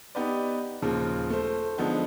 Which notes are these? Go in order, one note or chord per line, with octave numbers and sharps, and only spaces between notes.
B3 D#4 G4 B4 D5
D#2 A#2 C#3 F3
A3 C5
D3 F3 G#3 B3 D#4